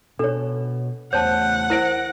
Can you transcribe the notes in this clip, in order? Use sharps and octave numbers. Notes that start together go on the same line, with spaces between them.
B2 D4 A4 C#5
E2 E3 A3 C5 C#5 F#5 A5 G6
E4 A#4 C5 A#6 D7